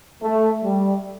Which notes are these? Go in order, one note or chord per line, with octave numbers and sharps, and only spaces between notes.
A3
G3